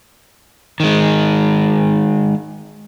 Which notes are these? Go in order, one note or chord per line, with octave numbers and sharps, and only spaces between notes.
D#3 G#3